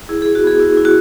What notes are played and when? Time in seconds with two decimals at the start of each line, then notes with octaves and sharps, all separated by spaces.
0.09 E4 G#4
0.22 E4 G#4
0.35 F#4
0.44 B3 G#4
0.60 E4
0.77 E4
0.85 F#4